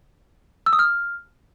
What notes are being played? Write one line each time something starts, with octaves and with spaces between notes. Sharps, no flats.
E6
D#6
F6